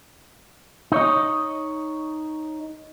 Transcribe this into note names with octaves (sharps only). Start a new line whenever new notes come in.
D#4 C#5 D#5